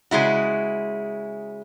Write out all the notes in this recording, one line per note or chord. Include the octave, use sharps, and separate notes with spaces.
C#3 G#3 E4 F#4